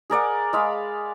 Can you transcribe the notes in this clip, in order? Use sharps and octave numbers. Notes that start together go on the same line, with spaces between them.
G#4 A#4 D5 F#5
G#3 F5 B5